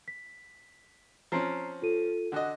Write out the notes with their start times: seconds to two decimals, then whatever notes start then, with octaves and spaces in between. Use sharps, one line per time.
0.08 B6
1.32 F3 C4 C#4 A#5 C7
1.82 F4 A4 D#7
2.32 D3 F#4 D#5